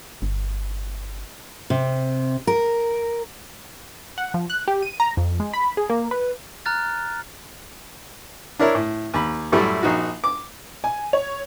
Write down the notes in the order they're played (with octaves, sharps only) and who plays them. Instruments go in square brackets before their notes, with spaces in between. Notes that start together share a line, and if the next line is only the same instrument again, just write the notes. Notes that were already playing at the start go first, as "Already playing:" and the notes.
[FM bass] G1
[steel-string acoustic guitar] C3
A#4
[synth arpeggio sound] F#5
F3
F#6
G4
D#7
A#5
F2
G#3
B5
G#4
A#3
B4
[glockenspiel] A#5 F6 F#6 A6
[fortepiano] D4 E4 A#4 C#5
A2
D#2 B5
F#2 A2 G3 A3 E4
A#1 D#4 F#4
D6
[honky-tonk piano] G#5
C#5